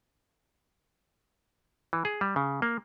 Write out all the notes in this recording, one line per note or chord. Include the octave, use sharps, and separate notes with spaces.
E3
G#4
G3
C#3
A#3